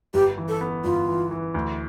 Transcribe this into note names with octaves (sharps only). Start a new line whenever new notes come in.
G1 G4
E3
A4
B3
G1 F4
E3
E3
D2